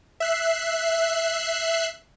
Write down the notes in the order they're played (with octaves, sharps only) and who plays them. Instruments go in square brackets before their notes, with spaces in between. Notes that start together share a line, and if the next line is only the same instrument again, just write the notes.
[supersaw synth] E5 F#6 C7